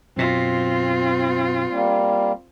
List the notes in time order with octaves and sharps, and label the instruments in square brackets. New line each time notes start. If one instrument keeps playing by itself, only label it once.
[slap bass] F#2 B2 [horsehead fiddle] C4 F4
[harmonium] G3 A#3